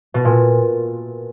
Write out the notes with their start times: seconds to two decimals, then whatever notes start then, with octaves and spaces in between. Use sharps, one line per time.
0.14 B2
0.25 A#2